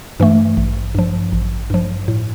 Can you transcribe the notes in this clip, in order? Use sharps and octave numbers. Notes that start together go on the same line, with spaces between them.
G2 E3 A3
A1
G2 F3
A1
G2 F3
A2